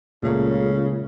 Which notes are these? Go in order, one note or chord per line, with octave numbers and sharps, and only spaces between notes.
C#2 A#2 C#3 A3 A#3